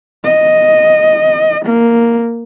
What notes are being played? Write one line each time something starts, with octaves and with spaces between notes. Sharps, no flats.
D#5
A#3